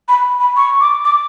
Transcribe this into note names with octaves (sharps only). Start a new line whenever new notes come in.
B5
B5
C#6
D6
D6